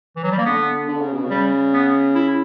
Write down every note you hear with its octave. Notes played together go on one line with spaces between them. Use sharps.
E3
F#3
G3
A#3
D3 B3
D3
C#3
B2
C#3
G3
B3
E4